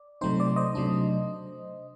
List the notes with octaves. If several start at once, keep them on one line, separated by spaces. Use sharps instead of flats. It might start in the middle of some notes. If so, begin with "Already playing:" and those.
Already playing: D5
C3 F#3 A3 C4 D#4 C5
D5
C5 D#5
C3 F#3 A3 D4